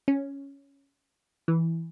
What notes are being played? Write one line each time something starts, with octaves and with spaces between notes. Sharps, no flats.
C#4
E3